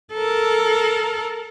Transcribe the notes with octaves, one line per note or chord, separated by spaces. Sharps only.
A4 A#4